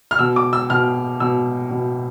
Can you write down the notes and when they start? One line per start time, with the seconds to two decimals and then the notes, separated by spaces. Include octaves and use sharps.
0.11 F6
0.19 B2 E6
0.36 D6
0.53 E6
0.70 B2 F6
1.20 B2 E6
1.71 B2